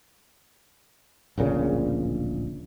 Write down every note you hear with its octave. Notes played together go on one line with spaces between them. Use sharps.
D1 A#1 A#2 C#3